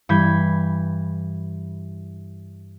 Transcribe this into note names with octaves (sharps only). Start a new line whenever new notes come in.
G2 E3 B5 G6 G#6